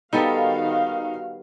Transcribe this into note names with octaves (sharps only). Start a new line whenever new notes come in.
D#3 G3 B3 D#4 F#4 A4 F5